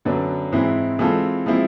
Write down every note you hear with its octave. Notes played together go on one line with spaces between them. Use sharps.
F#2 D3 F#3 B3 D4
G#2 E3 G#3 C4 E4
E3 G#3 C4 F4 A4
F3 G#3 C4 E4